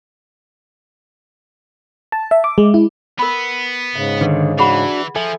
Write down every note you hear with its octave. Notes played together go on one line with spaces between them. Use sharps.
A5
E5
D6
G#3
E4
B3 A#4 B5
G#2 C#3 E5
D3 D#3 B4
E3 D4 F#4 G#4 F#5 B5
F3 A4 E5 G#5